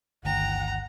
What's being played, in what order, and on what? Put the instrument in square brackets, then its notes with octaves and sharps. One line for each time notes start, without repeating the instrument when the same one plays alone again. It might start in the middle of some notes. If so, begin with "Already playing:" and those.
[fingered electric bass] G1 D2 D#3 [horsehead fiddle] F#5 [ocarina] G5 [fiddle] A#5